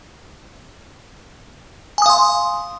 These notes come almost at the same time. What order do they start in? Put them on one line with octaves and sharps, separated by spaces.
G#5 D#6 F5 C6